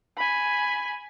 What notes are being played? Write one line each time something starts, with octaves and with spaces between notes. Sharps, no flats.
G#5 B5